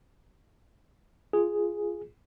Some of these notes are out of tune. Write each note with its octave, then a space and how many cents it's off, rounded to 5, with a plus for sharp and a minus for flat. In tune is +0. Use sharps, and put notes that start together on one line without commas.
F4 -10 G#4 +0